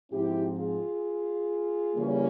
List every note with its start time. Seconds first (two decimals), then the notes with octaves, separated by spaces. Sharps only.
0.11 G#2 F3 C4 E4 G4
0.57 F4 G#4
1.96 C#3 E3 G3 A#3 C#4